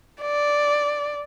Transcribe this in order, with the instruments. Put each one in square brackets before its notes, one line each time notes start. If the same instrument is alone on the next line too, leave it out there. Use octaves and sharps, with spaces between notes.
[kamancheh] D5